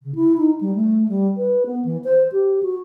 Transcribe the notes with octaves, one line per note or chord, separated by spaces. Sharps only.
C#3
E4
D#4
G3
A3
G3
B4
B3
E3
C5
G4
F#4